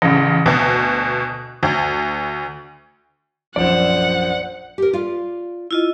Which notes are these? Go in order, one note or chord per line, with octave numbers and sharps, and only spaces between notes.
A1 C#3
D2 B2
D2
A#1 F#2 F3 C5 D5 F#5
G4 A#4
F4 D5 F5
E4 F4 D#5